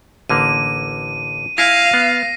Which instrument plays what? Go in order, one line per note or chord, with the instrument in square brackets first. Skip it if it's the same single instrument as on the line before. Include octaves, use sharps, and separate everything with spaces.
[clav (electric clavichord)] A1 D3 A#3 [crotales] D#7
[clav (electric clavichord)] E4 G#5 [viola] F5 [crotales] A#6 C7 D#7
[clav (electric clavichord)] B3